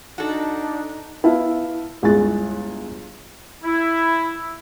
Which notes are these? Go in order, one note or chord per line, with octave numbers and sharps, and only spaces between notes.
D4 D#4 F#4 A4
B3 E4 F5 A5
G1 C#2 E4 G#4 F#6 A6
E4